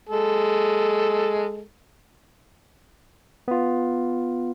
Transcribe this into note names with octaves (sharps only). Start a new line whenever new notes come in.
G#3 A4
B3 F4